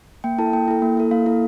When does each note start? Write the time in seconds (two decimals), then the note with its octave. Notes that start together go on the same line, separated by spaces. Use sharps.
0.24 A#3 G5
0.38 E4 A4 A5
0.53 A#3 G5
0.68 E4 A4
0.82 A#3
0.97 E4 A4
1.11 A#3 F5
1.26 E4 A4